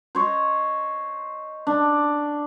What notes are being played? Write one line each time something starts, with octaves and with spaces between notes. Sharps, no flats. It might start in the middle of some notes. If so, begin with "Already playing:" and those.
C5 C#5 D#5
D4